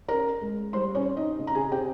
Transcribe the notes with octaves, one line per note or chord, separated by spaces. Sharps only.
C#4 A#4 A#5
G#3
G3 C5 C6
C#4 C#5
C4
D#4 D#5
C#3
A#5
G#4 G#5
C4 G4 G5